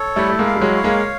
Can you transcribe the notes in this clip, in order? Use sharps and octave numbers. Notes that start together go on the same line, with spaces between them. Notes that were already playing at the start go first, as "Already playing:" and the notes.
Already playing: A4 C#5
G3 A3 E4
A3
G#3 A#3
F5
G3
F#3 G#3
C#5
G#3 A#3